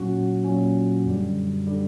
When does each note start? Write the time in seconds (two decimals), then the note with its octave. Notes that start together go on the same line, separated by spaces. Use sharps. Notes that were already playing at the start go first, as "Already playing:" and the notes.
Already playing: A#2 F#3 C#4 F#4
0.45 A#2 F#3 C#4
1.05 F#2 D3 G3
1.67 D3 G3